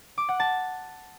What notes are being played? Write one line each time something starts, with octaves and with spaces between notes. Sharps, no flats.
D6
F#5
A5